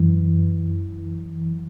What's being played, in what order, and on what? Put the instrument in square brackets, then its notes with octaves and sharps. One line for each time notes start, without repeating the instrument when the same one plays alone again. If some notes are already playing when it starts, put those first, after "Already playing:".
Already playing: [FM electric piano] F#2 E3